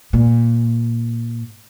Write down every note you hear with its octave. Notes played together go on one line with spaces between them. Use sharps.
A#2